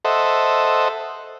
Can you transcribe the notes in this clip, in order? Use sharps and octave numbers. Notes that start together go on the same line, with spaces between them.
A4 C5 D#5 E5 F#5